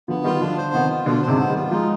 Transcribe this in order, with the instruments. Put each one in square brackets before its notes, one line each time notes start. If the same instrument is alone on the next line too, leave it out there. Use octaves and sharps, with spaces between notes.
[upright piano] D3 F3 [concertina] B3
[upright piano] D#3 G3 [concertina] F4
[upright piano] D3 F3 [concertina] D4
[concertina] C5
[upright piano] C3 D#3 [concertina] B3
[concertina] F4
[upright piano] B2 D3 [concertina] D4
[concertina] C5
[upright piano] G#2 C3
[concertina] B3
[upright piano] D#3 G3
[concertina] F4
[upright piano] F3 G#3 [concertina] D#4